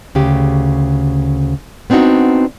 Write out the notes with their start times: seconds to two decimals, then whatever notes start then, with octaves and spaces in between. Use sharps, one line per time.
0.15 D2 C#3 G4
1.90 B3 C4 D4 D#4 F#4